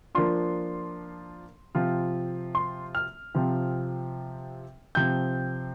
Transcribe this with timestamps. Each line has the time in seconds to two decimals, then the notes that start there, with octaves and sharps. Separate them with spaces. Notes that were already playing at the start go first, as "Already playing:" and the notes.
0.15 F3 A#3 D4 F4 C6
1.75 C3 F3 C4 F4
2.55 C6
2.95 F6
3.34 C3 F3 C4 F4
4.95 C3 F3 C4 G6